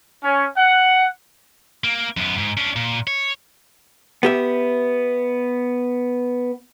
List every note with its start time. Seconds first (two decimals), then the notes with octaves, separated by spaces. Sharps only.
0.24 C#4
0.58 F#5
1.84 A#3
2.17 F#2 B3
2.38 G#2
2.57 C#4 D4
2.76 A#2
3.07 C#5
4.23 B3 G4 E5